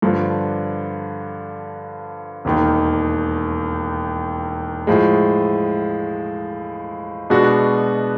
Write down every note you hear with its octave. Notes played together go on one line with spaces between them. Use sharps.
G2 D3 F3
E1 D#2 D#3
A2 F3 G#3
B2 G#3 B3 D4 F#4